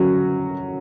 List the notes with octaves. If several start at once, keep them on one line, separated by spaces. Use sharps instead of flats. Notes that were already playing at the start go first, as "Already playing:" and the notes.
Already playing: F#3 C#4 F#4